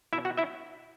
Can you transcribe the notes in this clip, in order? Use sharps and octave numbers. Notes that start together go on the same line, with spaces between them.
B2 E4 E5
F#4 F#5
E4 E5